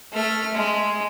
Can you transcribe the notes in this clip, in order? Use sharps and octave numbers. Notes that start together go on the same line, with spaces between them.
A3 F6
G#3